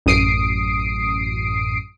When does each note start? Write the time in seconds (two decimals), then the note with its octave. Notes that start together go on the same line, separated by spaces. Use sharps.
0.06 A1 F#2 D#6 C7 D7